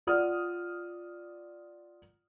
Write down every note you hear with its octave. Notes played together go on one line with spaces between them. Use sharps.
F4 D5 F#5 D#6 F6